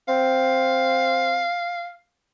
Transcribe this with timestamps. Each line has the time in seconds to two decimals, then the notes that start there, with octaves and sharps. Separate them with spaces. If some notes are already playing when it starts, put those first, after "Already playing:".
0.08 C4 F5